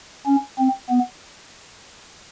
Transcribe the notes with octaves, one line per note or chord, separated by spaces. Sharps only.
C#4
C4
B3